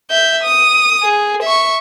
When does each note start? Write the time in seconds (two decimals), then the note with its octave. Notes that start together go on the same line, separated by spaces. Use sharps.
0.11 E5 G6
0.43 D#6
1.03 G#4
1.43 E5 C#6